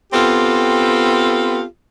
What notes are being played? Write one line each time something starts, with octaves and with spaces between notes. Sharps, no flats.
B3 C4 F4 G4 A4